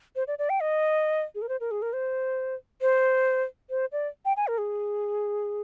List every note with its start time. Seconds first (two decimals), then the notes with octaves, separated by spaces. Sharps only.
0.16 C5
0.28 D5
0.39 D5
0.50 G5
0.60 D#5
1.35 G#4
1.42 A#4
1.49 C5
1.60 A#4
1.71 G#4
1.82 A#4
1.93 C5
2.81 C5
3.70 C5
3.92 D5
4.25 G5
4.37 G#5
4.47 A#4
4.58 G#4